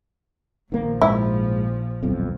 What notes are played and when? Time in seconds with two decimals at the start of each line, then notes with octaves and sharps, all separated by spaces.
0.72 A#1 D#3 F3 A#3
1.02 G#2 E4
2.03 D#1 B1 F2